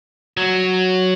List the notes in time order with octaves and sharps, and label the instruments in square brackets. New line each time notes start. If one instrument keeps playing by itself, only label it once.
[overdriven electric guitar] F#3